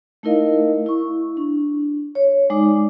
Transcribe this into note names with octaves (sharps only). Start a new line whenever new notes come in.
A3 D#4 E4 A#4 D#5 F5
E4 C#6
D4
C#5
G#3 D#4 D5 D6